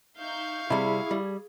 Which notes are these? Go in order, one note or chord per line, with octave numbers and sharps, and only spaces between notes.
D#4 E5 F5 C#6 G6
C3 G3 E4 G#4
G3